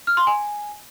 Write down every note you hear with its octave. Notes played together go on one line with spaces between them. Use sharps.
F6
C6
G#5